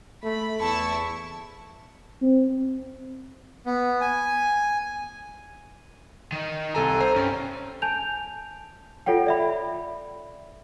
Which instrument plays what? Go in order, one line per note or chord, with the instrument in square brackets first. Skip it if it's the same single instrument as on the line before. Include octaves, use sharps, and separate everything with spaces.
[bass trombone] A3 [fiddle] B5
[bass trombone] E2 [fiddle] E4 C#6 [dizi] A5
[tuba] C4
[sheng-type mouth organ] B3
G#5
[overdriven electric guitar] D#3 D#4
[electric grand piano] C2 A4 A#5 [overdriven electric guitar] G#5
[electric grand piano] C5 A#5
[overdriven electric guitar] G2 [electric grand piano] C#4
[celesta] G#5 A5 G6 F7
F4 A4 C#5 F#5 G5
D5 E5 B5